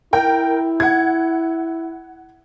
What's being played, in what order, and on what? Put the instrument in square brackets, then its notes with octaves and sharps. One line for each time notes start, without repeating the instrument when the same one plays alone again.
[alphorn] E4 [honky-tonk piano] A#4 G5
[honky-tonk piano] F#5 G#6